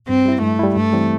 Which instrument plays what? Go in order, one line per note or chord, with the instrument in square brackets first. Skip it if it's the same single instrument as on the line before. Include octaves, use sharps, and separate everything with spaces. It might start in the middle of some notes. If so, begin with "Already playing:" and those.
[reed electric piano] G2 [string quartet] C4
[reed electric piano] G3 E4
[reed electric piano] G2 [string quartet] A3
[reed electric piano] G3 E4
[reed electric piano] G2 [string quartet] A3
[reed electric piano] E3 G3 C4 E4